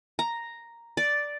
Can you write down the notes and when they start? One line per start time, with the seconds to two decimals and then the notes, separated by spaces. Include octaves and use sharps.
0.19 A#5
0.97 D5